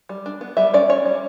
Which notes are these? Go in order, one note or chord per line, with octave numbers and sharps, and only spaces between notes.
G3
D4
B3
G3 E5
C#4 D5
C#4 C#5
G3